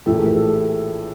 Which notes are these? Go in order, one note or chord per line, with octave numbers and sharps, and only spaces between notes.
A#1 A2 E3 G4 A4
G#4 A#4
G#4 A#4
G4 A4